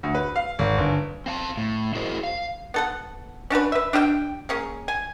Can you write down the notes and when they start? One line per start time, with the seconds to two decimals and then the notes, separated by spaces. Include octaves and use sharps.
0.03 D2
0.15 B4
0.36 F5
0.59 G#1
0.78 G1
1.26 C4 F5 A5
1.57 A2
1.95 E4 F#4 G#4 A#4 C5 D#5
2.23 F5
2.74 B3 A4 F#5
3.50 C#4 D4 F#4 B4
3.72 B4 E5
3.93 D4 G4 E5 G5
4.49 A#3 C#4 G#4
4.88 G#5